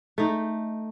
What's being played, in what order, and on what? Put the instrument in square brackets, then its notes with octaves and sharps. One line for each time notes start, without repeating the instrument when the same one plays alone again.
[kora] A3 D#4